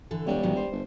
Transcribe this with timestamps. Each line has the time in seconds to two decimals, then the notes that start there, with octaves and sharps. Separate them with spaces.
0.11 D3 E3 A4
0.26 E1 G3 D4 A4 C#5
0.43 A2 D#3 F#3
0.57 C5
0.72 G1